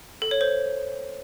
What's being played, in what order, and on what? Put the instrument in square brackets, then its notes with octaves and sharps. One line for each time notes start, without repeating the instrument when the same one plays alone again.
[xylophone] A4
C#5
C5